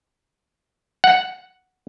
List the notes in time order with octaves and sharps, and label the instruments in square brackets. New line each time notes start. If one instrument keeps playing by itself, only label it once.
[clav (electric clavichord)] F#5